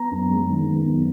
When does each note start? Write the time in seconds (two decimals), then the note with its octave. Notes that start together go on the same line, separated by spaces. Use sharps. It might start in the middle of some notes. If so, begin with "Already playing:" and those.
Already playing: B3 A#5
0.11 F#2
0.30 G#3
0.49 D#3
0.68 B3
0.87 F#2